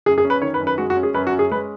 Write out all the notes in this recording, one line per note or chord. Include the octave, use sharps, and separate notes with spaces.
F#2 G#4
G#4
C#4
B4
D#3 C#5
B4
F#2
B4
G#3 F#4
F#4
C#4
G#4
F#2 B4
F#4
C#4
G#4
G#3 B4